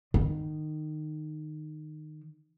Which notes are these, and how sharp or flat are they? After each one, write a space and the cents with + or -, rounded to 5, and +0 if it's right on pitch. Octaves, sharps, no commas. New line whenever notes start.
D#3 -20